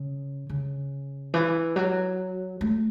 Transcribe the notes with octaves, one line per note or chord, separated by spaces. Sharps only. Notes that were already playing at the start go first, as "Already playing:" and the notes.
Already playing: C#3
C#3
E3
F#3
A3